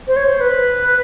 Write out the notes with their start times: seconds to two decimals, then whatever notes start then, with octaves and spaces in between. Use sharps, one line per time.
0.08 C5
0.16 C#5
0.28 C5
0.41 B4